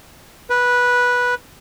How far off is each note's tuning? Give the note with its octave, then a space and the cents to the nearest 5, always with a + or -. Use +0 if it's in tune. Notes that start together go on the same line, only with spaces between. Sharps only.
B4 -10